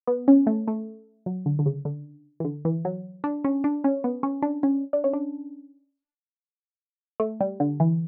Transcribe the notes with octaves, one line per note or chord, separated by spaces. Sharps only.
B3
C#4
A3
A3
F#3
D3
D3
C#3
D3
E3
D3
E3
F#3
D4
C#4
D4
C#4
B3
C#4
D4
C#4
D4
C#4
D4
A3
G3
D3
E3